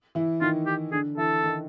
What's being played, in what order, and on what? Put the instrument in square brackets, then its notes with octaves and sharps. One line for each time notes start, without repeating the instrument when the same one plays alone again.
[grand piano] E3 E4
[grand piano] D#3 D#4 [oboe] F4
[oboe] G4
[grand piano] D3 D4 [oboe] G#4
[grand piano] E3 E4 [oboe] A4
[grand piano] D#3 D#4